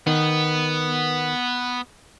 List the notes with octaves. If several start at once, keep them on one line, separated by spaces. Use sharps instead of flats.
D#3 B3